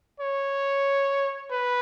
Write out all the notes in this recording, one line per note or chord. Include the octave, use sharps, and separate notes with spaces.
C#5
B4